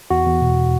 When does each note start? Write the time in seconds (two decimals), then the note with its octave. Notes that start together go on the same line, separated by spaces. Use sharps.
0.10 E2 F#4
0.26 E2
0.41 B2